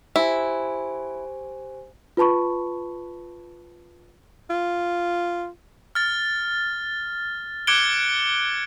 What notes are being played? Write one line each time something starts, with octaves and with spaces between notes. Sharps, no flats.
E4 G4 C5 G#5
F4 B4 A5 B5 C#6
F4
F6 A6
D6 F#6 G#6 C#7 D7 G7